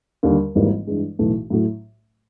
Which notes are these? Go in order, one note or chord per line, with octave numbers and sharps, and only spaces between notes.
D#2 D3 G3
G#1 G#2 E3 G3 A#3
G2 E3 G#3
B1 A2 E3 A3
A2 F#3 A3